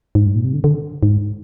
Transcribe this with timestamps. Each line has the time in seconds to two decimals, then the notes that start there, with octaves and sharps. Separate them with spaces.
0.15 G#2
0.26 G2
0.35 A#2
0.44 C3
0.54 D3
0.64 D3
1.03 G#2